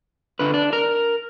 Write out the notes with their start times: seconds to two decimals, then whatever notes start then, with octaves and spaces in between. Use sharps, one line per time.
0.39 D3 B4
0.54 D4
0.73 A#4